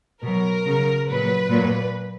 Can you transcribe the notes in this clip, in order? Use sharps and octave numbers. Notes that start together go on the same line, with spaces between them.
B2 F#3 A#4
C#3 F#3
A#2 F#3 B4
A#2 F#3